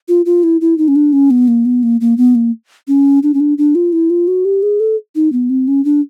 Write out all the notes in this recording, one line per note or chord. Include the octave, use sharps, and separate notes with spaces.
F4
F4
E4
E4
D#4
C#4
D4
C#4
B3
A#3
B3
A#3
A#3
B3
A#3
C#4
D4
C#4
D4
D4
F4
E4
F4
F#4
G4
G#4
A4
D#4
B3
C4
C#4
D4